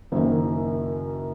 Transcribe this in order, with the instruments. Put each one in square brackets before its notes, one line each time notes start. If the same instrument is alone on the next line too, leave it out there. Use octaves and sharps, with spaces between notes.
[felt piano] F#1 F#2 D#3 A#3